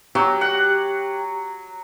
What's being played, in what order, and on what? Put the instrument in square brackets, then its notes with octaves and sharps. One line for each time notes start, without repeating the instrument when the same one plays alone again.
[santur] F#3 [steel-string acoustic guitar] G4
[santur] F#5